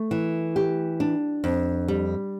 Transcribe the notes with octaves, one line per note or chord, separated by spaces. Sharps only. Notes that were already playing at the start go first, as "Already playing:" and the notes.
Already playing: A3
E3
G4
D4
F2
G3